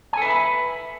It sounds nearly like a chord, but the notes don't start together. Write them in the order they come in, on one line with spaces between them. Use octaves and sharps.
G#5 A4 B4 E5 B5